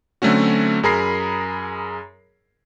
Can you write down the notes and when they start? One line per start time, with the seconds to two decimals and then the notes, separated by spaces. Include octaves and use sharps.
0.22 D3 F#3 A3 C4 C#4 F#4
0.83 F#2 G#4 A#4 A#5 B5 C7